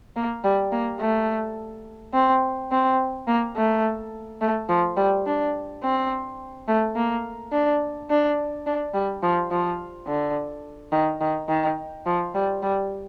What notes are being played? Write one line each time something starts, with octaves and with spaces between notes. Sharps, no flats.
A#3
G3
A#3
A3
C4
C4
A#3
A3
A3
F3
G3
D4
C4
A3
A#3
D4
D4
D4
G3
F3
F3
D3
D#3
D#3
D#3
F3
G3
G3